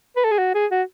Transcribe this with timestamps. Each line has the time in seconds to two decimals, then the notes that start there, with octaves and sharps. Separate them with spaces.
0.16 B4
0.24 A4
0.31 G#4
0.38 F#4
0.55 G#4
0.71 F#4